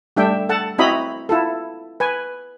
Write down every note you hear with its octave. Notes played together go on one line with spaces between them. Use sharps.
G3 A3 D4 E5 G5
A4 F#5 A5
C4 E4 F#4 D#5 A#5 B5
E4 F4 A4
B4 G#5